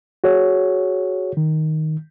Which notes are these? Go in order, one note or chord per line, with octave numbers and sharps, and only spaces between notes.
F#4 G#4 C#5
D#3